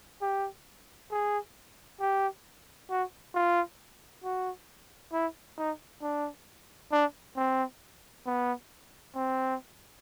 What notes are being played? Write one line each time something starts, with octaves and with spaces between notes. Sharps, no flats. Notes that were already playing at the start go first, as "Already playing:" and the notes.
G4
G#4
G4
F#4
F4
F#4
E4
D#4
D4
D4
C4
B3
C4